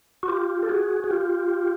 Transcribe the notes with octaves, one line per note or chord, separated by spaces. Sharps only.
F#4
F4 G4
A4
F#4 G#4
G#4
F4 G4